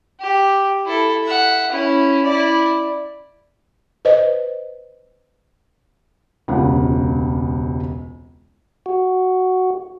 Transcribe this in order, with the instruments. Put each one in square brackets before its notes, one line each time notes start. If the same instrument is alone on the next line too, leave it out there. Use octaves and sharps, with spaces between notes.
[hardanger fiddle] G4
E4 A4
E5 F#5
C#4 E4
E4 D5
[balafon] B4 C5 D#5
[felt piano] E1 C#2 C3 A#3 F4 F#5
[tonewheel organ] F#4